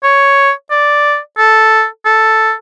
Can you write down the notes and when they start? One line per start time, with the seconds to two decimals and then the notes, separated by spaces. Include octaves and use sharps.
0.04 C#5
0.71 D5
1.38 A4
2.05 A4